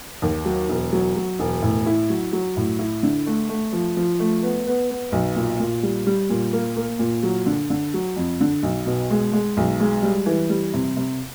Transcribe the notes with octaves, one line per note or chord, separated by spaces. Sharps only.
D#2
F#3
E1
F#3
F#3
E1
A2
E4
F#3
F#3
A2
E4
D3
A3
A3
F3
F3
A3
B3
B3
B3
B1
A#2
A#2
G3
G3
A#2
A#3
A#3
A#2
F#3
D3
D3
F#3
F2
D3
B1
B2
G#3
G#3
B1
G#3
G3
E3
G3
C3
C3